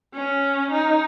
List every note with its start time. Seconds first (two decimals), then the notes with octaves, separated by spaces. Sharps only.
0.14 C#4
0.71 D#4